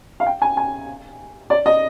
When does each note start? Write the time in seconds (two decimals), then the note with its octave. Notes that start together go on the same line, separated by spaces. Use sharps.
0.20 F5
0.26 G5
0.42 G#5
0.57 G#5
1.50 D5
1.66 D#5